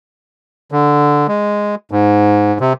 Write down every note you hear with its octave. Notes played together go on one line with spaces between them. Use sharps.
D3
G#3
G#2
C3